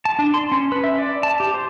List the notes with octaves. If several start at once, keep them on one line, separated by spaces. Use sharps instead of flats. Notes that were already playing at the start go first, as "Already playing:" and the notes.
A5
D4
C6
C#4
B4
E5
D5
A5
G4
C5